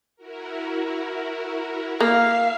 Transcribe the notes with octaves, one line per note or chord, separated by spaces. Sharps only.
E4 F#4 A#4
A#3 E5 F5 C7